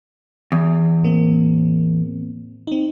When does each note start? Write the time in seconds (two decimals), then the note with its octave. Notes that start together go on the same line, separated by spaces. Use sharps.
0.52 E2
1.03 A2 A#3 C4
2.67 C4 D#4